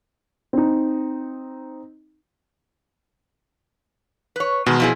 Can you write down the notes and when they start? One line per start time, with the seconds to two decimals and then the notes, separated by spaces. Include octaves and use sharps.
0.53 C4 D#4
4.36 B4 C#5
4.66 B2 D#3 G#3
4.80 F3 E4 G#4